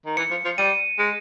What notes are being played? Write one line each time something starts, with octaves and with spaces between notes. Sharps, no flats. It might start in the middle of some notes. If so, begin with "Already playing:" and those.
D#3
E3 C#7
F3
F3
G3 D#7
G#3